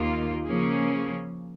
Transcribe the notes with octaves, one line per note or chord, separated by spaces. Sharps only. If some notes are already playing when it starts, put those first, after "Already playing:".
Already playing: D#2 D#3 A#3 F4
C#3 F3 A#3 C#4 G#4